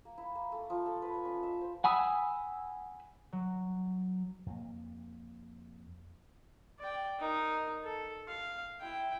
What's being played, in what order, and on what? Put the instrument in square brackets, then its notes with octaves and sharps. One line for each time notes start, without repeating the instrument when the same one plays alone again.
[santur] A#3
E4
A#3
A3
F3
A4
B4
C#5
C#4
E5
C5
[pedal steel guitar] F#5 G#5 B5 D#6 E6
[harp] F#3
[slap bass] F2 A#3
[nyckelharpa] D5 G5
D#4 A#4
A4
F5
E4 G5